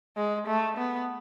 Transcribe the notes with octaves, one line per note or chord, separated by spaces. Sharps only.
G#3
A3
B3